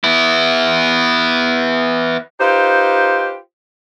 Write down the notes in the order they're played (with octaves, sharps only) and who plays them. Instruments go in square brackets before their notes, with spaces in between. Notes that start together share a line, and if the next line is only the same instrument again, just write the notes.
[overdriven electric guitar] B3 E4
[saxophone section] D#4 F4 G4 B4 C5